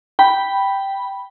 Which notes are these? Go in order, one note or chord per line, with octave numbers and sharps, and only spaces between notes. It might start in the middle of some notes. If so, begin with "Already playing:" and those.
G5 B5